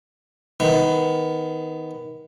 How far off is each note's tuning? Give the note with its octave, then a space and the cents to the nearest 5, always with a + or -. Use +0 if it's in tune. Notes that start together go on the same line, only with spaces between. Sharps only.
D#3 +25 B3 +15